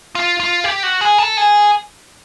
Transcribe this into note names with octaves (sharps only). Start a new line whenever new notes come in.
F4
F4
G4
F#4
G#4
A4
G#4